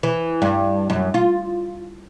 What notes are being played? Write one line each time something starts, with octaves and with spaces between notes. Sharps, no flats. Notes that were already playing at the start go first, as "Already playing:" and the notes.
E3
G2
F#2
F4